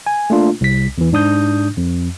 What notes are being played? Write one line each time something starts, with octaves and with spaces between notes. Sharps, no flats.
G#5
A3 A#3 D4 F4
C2 B6
E2 E3
G#2 D4 D#6 G6
F2